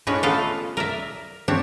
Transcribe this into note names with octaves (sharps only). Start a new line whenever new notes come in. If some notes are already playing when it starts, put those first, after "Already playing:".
A2 G#3 C#4 D4 B4 C#5
A3 B3 F4 A4 F5
A#4 D5 E5
C4 D4 C#5 E5